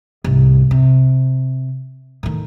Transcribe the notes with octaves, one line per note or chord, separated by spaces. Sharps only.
C2 G#2
C3
A2 D#3